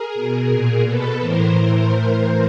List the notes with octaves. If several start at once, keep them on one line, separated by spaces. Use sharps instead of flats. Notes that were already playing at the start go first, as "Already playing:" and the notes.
Already playing: G#4 A#4
B2
A#2
B2 A4 B4
A2 E3 A#4 C5
A2 E3
A2 E3